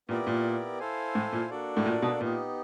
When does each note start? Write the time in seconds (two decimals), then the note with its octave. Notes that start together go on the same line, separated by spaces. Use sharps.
0.09 A#2 B3 E4 G4 A#4 D5
0.27 A#2
0.79 E4 A4 C5 F5 G#5
1.15 A2
1.33 A#2
1.50 A#3 D4 F#4 A4 D5
1.77 A2
1.86 A#2
2.02 B2
2.20 A#2 B3 D#4 G4